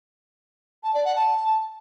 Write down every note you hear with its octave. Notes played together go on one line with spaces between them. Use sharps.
A5
D5
F#5
A5